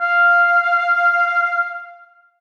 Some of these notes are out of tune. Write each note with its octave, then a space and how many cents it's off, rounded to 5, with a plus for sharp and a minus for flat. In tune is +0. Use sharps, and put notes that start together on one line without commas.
F5 -5